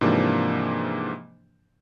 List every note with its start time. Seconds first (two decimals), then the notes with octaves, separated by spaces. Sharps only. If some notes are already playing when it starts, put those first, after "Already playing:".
0.01 G#2 C3 E3 F3 A#3 D4